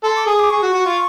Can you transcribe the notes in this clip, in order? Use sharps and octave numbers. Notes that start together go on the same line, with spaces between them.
A4 C6
D6
G#4 D#6
D6
G#4 C#6
F#4
F#4
F4